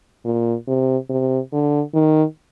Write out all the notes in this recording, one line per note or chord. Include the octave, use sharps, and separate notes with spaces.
A#2
C3
C3
D3
D#3